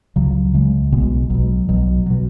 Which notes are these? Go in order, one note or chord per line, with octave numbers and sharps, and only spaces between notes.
C#2 C#3 F#3
C#2 C#3 G#3
B1 B2 G#3
B1 B2 F#3
B1 B2 F#3
B2 F#3